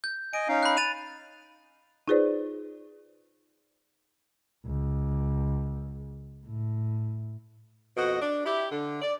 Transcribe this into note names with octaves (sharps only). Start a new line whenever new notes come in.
G6
D#5 G#5 D7
C#4 D#4 F5
B5 F#6
A6 D#7 F7
D#4 F4 G#4 B4 C5 D5
C#2
A2
F2 B2 F#4 D#5
D4
E4 G4
D3
D5